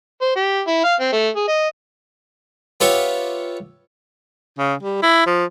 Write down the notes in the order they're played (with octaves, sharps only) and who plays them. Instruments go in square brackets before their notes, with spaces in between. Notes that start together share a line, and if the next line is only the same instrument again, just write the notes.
[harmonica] C5
G4
E4
F5
C4
A3
G#4
D#5
[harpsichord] B3 F4 G4 C#5 E5
[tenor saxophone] C#3
G3
E4
F3